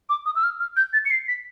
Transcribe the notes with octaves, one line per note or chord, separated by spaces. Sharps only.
D6
D#6
E6
F6
F6
G6
A6
C#7
C7
B6